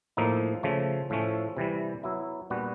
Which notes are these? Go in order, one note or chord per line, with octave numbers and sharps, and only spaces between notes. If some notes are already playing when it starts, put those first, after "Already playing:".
A2 F3 A#3 D#4
C#3 F3 A3
A2 F3 A3 C#4
C3 E3 G3
F#3 B3 E4
A#2 G3 B3 D4 F#4